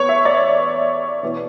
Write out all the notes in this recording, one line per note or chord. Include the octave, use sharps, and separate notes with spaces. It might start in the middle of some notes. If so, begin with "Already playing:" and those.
Already playing: E2 B4 C#5
E5
D5
E2 B2